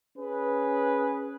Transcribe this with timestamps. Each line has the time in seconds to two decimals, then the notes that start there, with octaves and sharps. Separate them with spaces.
0.18 C#4 G#4 B4